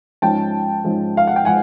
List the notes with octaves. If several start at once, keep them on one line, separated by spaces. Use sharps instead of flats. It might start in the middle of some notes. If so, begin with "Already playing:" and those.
G#2 F3 G#3 C#4 G5 A5
G#2 F3 G#3 C#4
F5
F#5
G5
F3 G#3 F#5 G#5